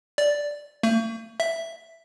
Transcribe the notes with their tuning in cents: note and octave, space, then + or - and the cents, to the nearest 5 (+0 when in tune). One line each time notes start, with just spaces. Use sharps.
D5 -5
A3 +45
E5 +5